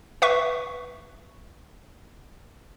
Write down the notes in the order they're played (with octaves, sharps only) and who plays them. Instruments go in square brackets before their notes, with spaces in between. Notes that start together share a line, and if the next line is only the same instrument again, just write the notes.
[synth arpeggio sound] B4 E5 C#6